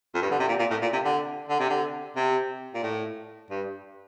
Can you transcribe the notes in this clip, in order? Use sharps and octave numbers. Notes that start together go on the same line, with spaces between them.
F2
G2
D3
C3
A#2
A#2
A2
A#2
C3
D3
D3
C3
D3
C3
A#2
A2
G2